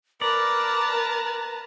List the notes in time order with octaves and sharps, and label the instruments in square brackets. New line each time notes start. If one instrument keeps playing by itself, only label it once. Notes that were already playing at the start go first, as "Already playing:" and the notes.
[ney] A#4 [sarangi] B4 [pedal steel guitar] D5 [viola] A5 A#5